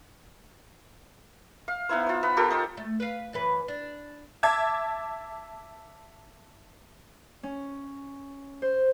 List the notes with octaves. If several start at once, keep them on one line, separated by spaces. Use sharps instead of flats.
F5
B3 D#4 E4 C5
F4 C5
B3 B5
F4 G4 A4 A#4
D#4 C5 G5
A3
B4 F5
F#2 E3 B4
D4
E5 A5 D6 G#6
C#4
C5